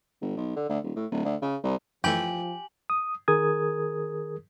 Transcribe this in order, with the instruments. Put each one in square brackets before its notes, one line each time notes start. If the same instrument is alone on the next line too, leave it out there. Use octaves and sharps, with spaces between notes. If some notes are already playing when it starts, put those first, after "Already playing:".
[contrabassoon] G1
B1
D3
D2
D#1
A2
D1
D2
C#3
C2
[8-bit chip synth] F#2 E3 A3 [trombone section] F3 [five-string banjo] G4 [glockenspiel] G#5 F#7
[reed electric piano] D#6
D#3 G#4 A#4 D#6 G#6